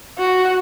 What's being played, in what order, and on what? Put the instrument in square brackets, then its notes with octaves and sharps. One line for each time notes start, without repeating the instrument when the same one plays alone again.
[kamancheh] F#4